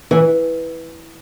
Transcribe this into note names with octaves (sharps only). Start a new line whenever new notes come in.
E3